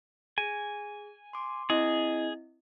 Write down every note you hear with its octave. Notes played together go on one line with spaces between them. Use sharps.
G#4 G#5
C6 D6
C4 E4 G#4 D#5